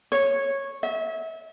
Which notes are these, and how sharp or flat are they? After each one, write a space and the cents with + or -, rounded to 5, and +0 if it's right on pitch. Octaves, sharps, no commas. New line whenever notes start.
C#5 -10
E5 -30